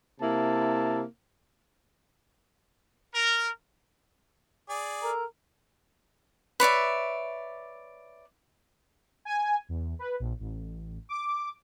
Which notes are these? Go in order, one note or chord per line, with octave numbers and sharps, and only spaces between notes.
C3 A#3 E4 A5
A#4
G#4 D5
A4 A#4 A#5
B4 C#5 D5 E5
G#5
E2
B4
A#1
A1
D6